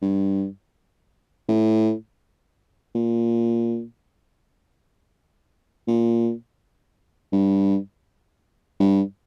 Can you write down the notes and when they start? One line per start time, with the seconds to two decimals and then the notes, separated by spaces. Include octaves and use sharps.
0.02 G2
1.48 A2
2.95 A#2
5.87 A#2
7.32 G2
8.80 G2